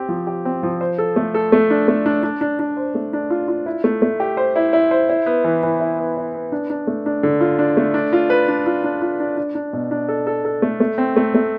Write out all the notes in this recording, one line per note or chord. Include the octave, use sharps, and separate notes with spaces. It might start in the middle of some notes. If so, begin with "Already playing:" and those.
Already playing: C4 G4
F3
G4
C4
F3
C5
A4
A3
A4
A3
D4
A3
D4
D4
D4
D4
C5
A3
D4
F4
F4
E4
A3
A3
G4
C5
E4
E4
C5
E4
B3
E3
E3
E4
B3
E4
B3
D4
D4
A3
D4
D3
F4
D4
A3
D4
F4
B4
D4
F4
D4
F4
D4
D4
D4
B2
D4
A4
A4
A4
A3
A3
C4
A3
A3